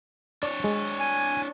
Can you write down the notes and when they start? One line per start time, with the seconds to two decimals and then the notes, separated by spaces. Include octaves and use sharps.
0.43 D4 C#5 D5
0.64 G#3
0.99 G#5